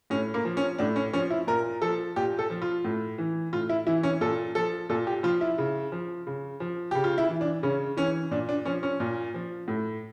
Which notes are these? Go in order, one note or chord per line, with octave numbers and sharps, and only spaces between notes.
A2 C#4
A#3
F3
C#4
A2 D4
C#4
F3 C#4
E4
A#2 A#4
F3 A4
A#2 G4
A4
F3
F4
A2
E3
A2 F4
E4
E3 E4
C#4
A#2 A4
F3 A4
A#2 A4
G4
F3 F4
E4
C#3
F3
C#3
F3
C#3 G4
F4
E4
E3
D4
C#3 C#4
E3 C#4
A#2 D4
D4
F3 C#4
C#4
A#2
F3
A2